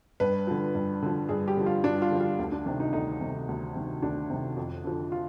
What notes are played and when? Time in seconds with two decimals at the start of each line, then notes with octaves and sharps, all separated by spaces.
0.20 G2 B4
0.47 D3 F3
0.75 G2
1.02 D3 F3
1.29 G2 G#4
1.48 G4
1.57 D3 F3
1.66 F4
1.84 G2 D4
2.02 F4
2.11 D3 F3
2.20 F4
2.39 D2
2.52 D4
2.66 C3 D#3 D4
2.80 D#4
2.93 D2 D#4
3.20 C3 D#3
3.49 D2
3.75 C3 D#3
4.02 D2 D4
4.30 C3 D#3
4.57 F2
4.84 D3 F3
5.12 F4